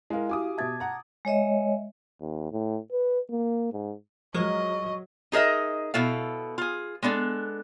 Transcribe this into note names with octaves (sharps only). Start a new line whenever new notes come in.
G#3 E4 A#4 F5
F#4 G4 G#5 D6 D#6
B2 E5 A5 G#6 A6
F#5 A#5
G#3 C#5 D#5 E5
D#2
A2
B4
A#3
G#2
F3 F#3 G#3 A#4 D#5 C#6
D#4 G#4 A#4 D#5 E5
B2 E4 A4 F5
F4 G#4
G#3 B3 D4 A4